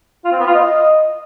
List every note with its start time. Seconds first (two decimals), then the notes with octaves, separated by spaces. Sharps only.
0.25 F4
0.32 C4
0.39 B3
0.47 F4
0.54 D#5